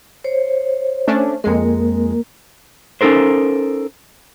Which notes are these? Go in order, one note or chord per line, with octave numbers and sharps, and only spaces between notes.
C5 C#5
A3 C#4 D4
F2 G#3 A#3 A#4
C#4 D#4 A4 A#4 C5